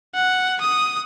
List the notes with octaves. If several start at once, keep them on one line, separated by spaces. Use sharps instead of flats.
F#5
D#6